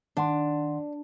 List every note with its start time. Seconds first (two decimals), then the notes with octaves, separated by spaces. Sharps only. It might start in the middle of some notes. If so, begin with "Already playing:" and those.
0.17 D#3 D4 F#5 C6